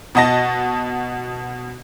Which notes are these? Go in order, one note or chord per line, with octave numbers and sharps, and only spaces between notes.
B2 F#4 D#5 A5 A#6